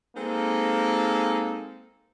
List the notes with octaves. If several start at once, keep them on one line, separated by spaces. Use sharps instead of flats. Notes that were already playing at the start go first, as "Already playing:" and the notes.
G#3 A#3 C4 D#4 A4